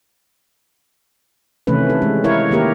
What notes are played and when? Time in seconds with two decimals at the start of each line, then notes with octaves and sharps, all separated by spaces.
1.67 C3 D#3 E3 A3 C#4 B4
1.90 A4
2.02 G#3
2.24 E4 A#4 C#5 F5
2.51 D#3 A#3 G4 A#4